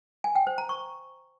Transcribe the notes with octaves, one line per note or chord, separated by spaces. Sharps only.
G#5
G5
C5
A#5
C#6